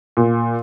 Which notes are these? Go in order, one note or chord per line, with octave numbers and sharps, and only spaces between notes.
A#2